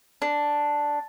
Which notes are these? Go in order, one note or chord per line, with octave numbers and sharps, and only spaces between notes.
D4